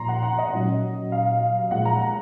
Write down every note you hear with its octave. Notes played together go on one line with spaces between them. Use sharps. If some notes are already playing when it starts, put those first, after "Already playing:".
Already playing: A#2 F3 A#5 C6
F#5
F#5
D#5
A#2 F#3 C#4
F5
A#2 F3 G#3 F#5
A#5
A#5